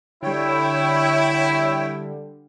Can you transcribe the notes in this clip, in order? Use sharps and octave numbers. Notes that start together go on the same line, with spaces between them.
D3 G3 E4 C#5 G5